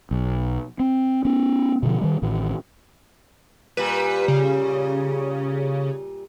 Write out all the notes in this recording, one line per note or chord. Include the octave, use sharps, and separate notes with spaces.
B1
C4
B3 C#4
B2 D3 F3
D#3 G3
A1 A2 D#3
A#2 G3 B4
C#3